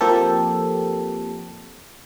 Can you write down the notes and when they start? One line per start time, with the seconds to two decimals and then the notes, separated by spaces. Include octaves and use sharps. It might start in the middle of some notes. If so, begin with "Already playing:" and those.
0.01 F3 A#3 C4 G4 A4